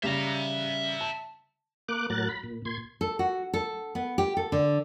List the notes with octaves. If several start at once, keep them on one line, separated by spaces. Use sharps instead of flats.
C#3 G3 E5 A#5
A5
A#3 D6 F#6
A2 F#3 A#4 F#6 A6
B5
A#2
A#2 C6 G#6
A4
F#4
A4
B3
G4
A4
D3